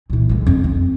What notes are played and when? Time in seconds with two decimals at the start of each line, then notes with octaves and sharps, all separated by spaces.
0.10 A#2 E3
0.29 D3 G#3
0.47 F2
0.64 C4